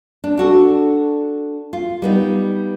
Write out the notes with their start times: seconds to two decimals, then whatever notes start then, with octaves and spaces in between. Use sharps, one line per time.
0.24 D4
0.37 D4 F#4 A4
1.73 F4
2.02 G3 B3 D#4